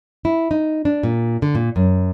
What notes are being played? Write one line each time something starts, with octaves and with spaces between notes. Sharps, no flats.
E4
D#4
D4
A#2
D3
A#2
F#2